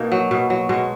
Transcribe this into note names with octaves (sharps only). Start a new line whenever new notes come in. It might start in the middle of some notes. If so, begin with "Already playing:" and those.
Already playing: B2 A#3 D#4
F#3
B2
F#3
B2 G#3